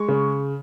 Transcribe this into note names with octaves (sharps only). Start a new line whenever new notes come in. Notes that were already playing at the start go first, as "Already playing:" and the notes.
Already playing: G#3 C#6
C#3